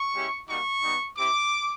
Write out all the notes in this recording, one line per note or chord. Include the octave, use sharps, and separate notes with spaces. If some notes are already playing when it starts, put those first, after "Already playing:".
Already playing: C#6
G#3 C#4 E4 G4
G3 A#3 D#4 F#4 C#6
G3 B3 D#4
C4 E4 G4 D6